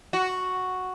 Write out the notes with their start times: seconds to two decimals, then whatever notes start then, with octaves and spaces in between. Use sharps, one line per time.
0.13 F#4